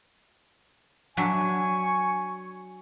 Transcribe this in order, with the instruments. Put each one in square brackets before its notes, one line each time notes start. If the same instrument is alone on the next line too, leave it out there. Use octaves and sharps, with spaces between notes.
[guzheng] F#3 D4 E5 [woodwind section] G#5 C#6